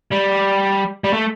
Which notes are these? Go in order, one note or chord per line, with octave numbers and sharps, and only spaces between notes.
G3
G3
A3